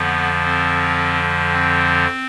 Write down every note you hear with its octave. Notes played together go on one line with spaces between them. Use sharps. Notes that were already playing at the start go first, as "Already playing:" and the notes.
Already playing: F2 D3 F3 B3
C4
C4